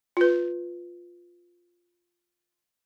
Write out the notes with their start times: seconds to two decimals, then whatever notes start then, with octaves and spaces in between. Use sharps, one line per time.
0.17 F4 B4